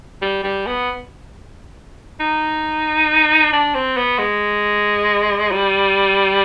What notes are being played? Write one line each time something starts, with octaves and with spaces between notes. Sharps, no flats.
G3
G3
B3
D#4
D4
C4
B3
G#3
G3